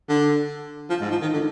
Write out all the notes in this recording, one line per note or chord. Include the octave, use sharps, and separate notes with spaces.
D3
F3
G#2
F3
D#3
D3